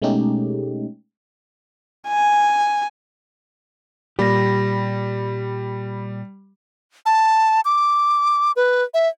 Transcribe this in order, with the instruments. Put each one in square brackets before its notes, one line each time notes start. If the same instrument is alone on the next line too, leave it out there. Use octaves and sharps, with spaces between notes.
[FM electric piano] B2 G#3 A3 C#4 D#4 G4
[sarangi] G#5
[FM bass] A#2 [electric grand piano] G3 [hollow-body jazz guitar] G4 [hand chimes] B5 A#6
[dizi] A5
D6
B4
E5